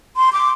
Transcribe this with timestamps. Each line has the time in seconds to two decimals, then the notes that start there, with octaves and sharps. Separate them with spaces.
0.17 C6
0.33 D6